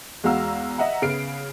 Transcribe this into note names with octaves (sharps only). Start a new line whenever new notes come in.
E2 G#3 F#4 F5 A#5 E6
D#5 E5 F#5 A#5
C#3 B3 F6 C7 D7